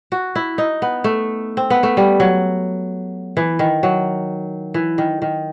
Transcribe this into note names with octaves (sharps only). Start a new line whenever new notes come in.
F#4
E4
D#4
B3
A3
C4
B3
A3
G3
F#3
E3
D#3
F#3
E3
D#3
D#3